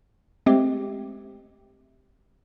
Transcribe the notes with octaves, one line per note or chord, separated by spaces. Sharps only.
G#3 A3 C4 G4